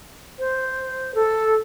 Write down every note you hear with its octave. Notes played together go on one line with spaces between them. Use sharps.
C5
A4